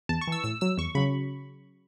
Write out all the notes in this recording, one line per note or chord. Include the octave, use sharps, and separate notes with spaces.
E2 A5
C#6
E3 E6
A2 E6
F#3 E6
E2 C#6
C#3 F#3 B5